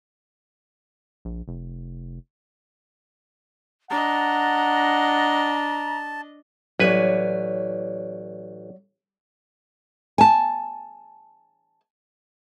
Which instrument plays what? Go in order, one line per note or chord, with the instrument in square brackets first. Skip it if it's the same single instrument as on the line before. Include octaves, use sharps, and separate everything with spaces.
[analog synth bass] A#1
F1
[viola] D4 D#5 [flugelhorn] F#5 [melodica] A5 [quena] A#5
[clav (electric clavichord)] A1 B4 G#5 [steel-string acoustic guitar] F#3 C#5 D5
[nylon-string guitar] G#5 A5